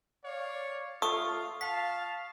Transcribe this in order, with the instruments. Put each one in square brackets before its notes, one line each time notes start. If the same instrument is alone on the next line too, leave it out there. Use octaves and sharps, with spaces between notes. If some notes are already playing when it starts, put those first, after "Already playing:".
[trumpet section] C#5 D5 F5
[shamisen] A3 [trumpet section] F4 [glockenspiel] C#6 D#6
[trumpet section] F5 A5 [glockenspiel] B6